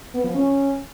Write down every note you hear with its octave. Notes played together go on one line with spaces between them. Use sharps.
B3
F3
C#4